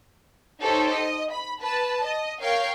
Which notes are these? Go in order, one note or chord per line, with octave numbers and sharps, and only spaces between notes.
D#4 G4 A4 C5 C#5
D#5
B5
B4 A5
D#5
A#4 C#5 F5 G5